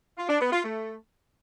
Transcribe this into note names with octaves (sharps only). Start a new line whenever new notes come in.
F4
D4
B3
F4
A3